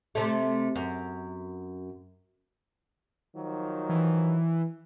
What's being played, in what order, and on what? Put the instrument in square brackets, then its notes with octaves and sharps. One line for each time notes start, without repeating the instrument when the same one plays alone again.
[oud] C3 A3
F#2
[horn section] D#3 F3 F#3
[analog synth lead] E3